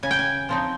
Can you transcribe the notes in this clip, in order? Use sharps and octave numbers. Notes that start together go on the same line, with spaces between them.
C#3 G#5
G5
G#5
F3 C4 D#4